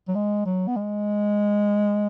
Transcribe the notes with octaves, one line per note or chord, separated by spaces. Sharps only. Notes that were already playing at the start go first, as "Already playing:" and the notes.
F#3
G#3
F#3
B3
G#3